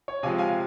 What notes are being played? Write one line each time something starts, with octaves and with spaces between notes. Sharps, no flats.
C#5
C3 F3 G#3 F5 G#5
F5 G#5